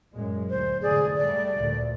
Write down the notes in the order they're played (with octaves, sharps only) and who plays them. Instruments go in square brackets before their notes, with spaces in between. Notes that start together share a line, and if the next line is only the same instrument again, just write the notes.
[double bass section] F#2 A#2 G#3
[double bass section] D2 [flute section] C5
[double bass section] F1 G#2 D3 [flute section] G#4 D5
[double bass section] G3 A3 [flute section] D5
[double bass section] D2 A#2